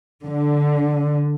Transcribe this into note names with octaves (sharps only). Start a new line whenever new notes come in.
D3